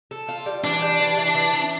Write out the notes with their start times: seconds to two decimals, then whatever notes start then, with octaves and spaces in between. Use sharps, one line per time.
0.11 A4
0.28 F4
0.46 G3
0.64 E3 D4
0.82 G3
1.00 E3
1.18 E3
1.35 E3
1.53 E3